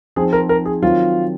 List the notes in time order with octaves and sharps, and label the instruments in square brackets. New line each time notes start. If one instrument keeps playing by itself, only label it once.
[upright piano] F3 C4 D#4 [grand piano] G#4
[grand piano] A#4
A#4
G#4
[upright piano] D#3 F#3 C4 [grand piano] F4